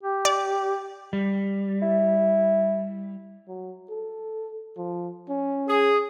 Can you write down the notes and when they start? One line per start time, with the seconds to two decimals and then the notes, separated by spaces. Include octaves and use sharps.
0.03 G4
0.25 D5
1.13 G3
1.82 E4
3.48 F#3
3.90 A4
4.77 F3
5.29 C#4
5.68 G#4